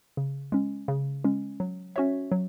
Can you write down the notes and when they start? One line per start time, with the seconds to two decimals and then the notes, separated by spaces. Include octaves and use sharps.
0.17 C#3
0.52 G#3 C#4
0.88 C#3
1.24 G#3 C#4
1.60 F#3
1.96 C#4 F#4 C#5 E5
2.32 F#3